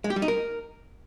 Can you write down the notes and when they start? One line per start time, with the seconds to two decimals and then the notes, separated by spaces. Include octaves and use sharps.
0.04 G#3
0.10 G4
0.16 G3
0.22 D#4
0.28 A#4